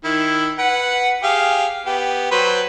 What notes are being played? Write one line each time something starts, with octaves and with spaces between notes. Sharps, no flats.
D#3 E4
B4 F#5
G4 G#4 F5
B3 G4
F#3 B4 C5